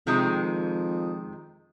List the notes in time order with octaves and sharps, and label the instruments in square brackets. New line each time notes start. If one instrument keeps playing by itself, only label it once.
[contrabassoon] F2 [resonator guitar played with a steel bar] C3 D#3 G#3